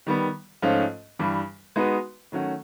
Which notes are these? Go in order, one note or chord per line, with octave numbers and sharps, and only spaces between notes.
D#3 G3 B3
G#2 F3 A3 C#4 F4
G2 E3 G3
G#3 B3 D#4 F#4 B4
D#3 F#3 A3 C#4 F#4